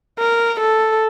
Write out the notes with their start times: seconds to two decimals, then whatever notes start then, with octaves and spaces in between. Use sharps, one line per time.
0.19 A#4
0.60 A4